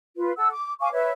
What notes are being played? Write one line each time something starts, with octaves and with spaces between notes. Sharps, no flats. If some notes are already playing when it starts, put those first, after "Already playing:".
F4 B4
A4 F#5 E6
D6
F5 G#5 C#6 D6
B4 C#5 E5